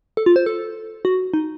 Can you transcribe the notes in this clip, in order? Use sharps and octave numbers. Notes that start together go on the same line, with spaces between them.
A4
F4
C5
A4
F#4
D#4